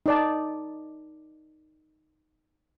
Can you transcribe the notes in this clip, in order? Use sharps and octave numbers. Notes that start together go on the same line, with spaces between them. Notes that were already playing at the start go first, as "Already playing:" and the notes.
D#4 D5 A5